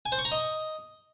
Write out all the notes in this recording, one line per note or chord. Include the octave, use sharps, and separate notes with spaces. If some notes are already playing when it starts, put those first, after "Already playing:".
G#5
C5
C#6
A#5
D#5